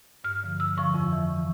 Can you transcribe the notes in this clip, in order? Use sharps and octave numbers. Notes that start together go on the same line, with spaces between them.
G2 F6
D3 F3
G2 E6
D3 F3 C#6
F2
E3